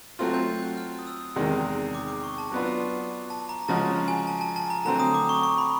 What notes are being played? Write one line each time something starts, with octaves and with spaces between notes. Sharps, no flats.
F#3 A3 C4 F4 F6
G6
F#6
F6
D#6
E6
E2 C3 D#3 G#3
D6
D6
C#6
A5
F#3 B3 D4 F4
A5
A#5
C#3 F3 G#3 C#4 F#4 A5
G#5
A5
A5
A5
A#5
D3 F#3 A3 C4 A#5
D#6
D6
C#6
C#6
B5